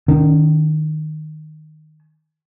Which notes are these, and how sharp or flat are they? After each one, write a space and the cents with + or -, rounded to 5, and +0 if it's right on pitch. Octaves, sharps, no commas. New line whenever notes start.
D#3 -10 C#4 +40